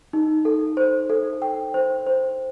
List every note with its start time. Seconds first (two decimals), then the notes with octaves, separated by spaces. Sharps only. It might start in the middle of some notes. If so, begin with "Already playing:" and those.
0.13 D#4
0.45 A4
0.77 C5
1.10 A4
1.42 G5
1.74 C5
2.06 C5